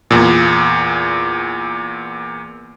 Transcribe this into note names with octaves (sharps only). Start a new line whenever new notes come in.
E2 A#2